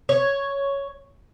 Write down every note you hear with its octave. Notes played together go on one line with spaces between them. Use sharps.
C#5